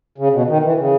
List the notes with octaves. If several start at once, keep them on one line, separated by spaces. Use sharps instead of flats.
C#3
B2
D#3
E3
C#3